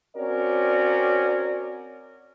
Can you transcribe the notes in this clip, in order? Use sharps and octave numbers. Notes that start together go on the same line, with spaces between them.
C4 C#4 F#4 A#4 C#5 D5